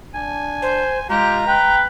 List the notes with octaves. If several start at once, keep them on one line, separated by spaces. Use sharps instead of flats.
D4 G#5
C5
G#3 F4 G4 A#5
B4 G5